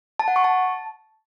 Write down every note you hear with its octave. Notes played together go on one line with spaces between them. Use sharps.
A5
F#5
C#6
A5